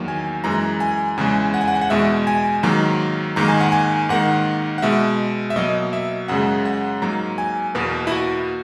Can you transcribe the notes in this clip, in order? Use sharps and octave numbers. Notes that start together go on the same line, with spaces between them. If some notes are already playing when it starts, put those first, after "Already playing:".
Already playing: E2 D#3 F#3 A#3
G#5
F#2 E3 G#3 A#5
G#5
E2 C#3 E3 G#3 G#5
F#5
G#5
F#5
G#5
F#5
E2 B2 G#3 E5
G#5
G#2 D#3 F#3 A#3 A#5
G#2 D#3 A#3 A#5
G#5
F#5
G#5
G#2 D#3 A#3 F#5
F#5
B2 G#3 E5
E5
B2 F#3 A#3 D#5
E5
F#2 C#3 G#3 F#5
F#5
G#2 F#3 A#3 A#5
G#5
E2 B2 A#3 B4
E4
F#4